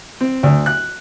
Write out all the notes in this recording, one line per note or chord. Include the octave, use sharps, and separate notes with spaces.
C4
D2
F#6